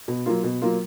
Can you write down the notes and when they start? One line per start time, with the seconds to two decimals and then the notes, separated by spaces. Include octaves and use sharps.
0.08 B2
0.26 F#3 A#3 F4
0.44 B2
0.62 F#3 A#3 F4